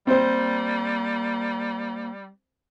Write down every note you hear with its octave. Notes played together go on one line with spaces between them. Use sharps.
G3 A#3 C4 C5